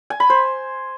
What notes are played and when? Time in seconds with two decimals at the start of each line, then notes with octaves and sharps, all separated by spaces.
0.10 G#5
0.20 B5
0.30 C5